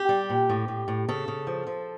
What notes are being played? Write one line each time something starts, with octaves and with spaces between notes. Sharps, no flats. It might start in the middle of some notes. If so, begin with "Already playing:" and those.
Already playing: G4
G3
A#2
A2
A2
A2
C#3 A4
C#3
F3
F3